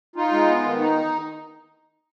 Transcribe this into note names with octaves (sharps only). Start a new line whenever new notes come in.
D#4 F4
G#3
B3
D#3
D#4